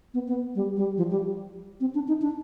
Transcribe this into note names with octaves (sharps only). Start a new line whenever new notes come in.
B3
B3
G3
G3
F3
G3
C4
D4
D#4
D4